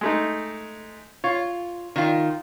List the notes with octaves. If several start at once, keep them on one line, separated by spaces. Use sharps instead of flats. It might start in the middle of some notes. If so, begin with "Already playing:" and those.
G#3 A3 D#4
F4 C#5
D#3 F4